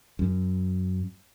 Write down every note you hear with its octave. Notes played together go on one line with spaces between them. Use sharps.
F#2